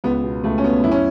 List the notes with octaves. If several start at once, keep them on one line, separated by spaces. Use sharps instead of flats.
C#2 B3
B2
C#2 A3
C#4
B2 B3
F#2 E4
C#4